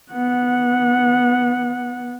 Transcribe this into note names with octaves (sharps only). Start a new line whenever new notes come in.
B3 F#5